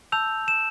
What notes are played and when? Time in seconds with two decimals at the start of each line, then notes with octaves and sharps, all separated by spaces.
0.12 A5 E6 G6 F7
0.48 E7